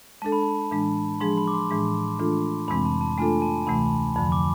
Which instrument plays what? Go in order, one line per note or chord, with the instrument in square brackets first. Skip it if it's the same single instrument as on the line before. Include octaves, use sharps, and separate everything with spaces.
[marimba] G#3 D4 A4 [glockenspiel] A5
[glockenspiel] B5
A5
[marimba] A2 E3 G#3 D4
[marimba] F3 G#3 D4 G#4 [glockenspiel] C6
[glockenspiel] B5
D6
C6
[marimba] A2 E3 G#3 D4 G#4
E3 A3 D4 F4 A4
[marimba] F2 C3 E3 G#3 C4 [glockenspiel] B5
[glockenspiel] A5
A5
[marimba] A3 D4 F4 A4 [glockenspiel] G#5
[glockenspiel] A5
[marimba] D2 C3 E3 A3 [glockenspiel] B5
[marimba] F2 D3 F3 [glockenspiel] B5
[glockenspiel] D6